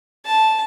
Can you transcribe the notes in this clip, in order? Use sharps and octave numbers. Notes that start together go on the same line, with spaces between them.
A5